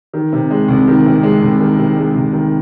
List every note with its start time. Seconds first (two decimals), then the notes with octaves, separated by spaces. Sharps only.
0.13 D#3
0.33 C3
0.51 G#3
0.68 C2
0.88 D#3
1.06 C3
1.23 G#3
1.42 C2
1.60 D#3
1.78 C3
1.97 G#3
2.15 C2
2.33 D#3